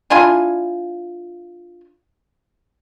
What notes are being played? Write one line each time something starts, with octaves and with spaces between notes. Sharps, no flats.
D4 E4 F4 G#5